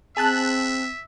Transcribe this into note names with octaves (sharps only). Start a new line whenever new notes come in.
C4 G#4 E5 A5 F#6